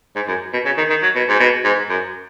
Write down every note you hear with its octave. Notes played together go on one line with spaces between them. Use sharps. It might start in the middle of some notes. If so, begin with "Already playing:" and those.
G#2
F#2
B2
C#3
D#3
D#3
F#3
B2
G#2
B2
G#2
F#2